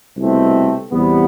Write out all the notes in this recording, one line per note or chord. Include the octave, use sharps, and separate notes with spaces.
C2 B2 A3 C4
E2 C3 G3 B3